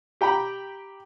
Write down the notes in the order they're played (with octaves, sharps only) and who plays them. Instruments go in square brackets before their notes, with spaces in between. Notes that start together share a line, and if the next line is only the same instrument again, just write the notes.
[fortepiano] G4 G5 A#5 B5